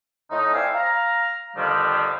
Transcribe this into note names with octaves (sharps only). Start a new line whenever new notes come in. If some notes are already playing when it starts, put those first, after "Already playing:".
A2 F3 D#4
C4 E4 D5 F5 G#5
F5 A#5
F2 D3 D#3 F3 G3